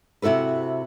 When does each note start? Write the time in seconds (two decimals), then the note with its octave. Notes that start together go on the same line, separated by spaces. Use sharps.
0.22 C3 E4 F#4 A4 B4